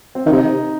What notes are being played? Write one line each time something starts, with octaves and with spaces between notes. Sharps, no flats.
C4
D#3 D#4
C3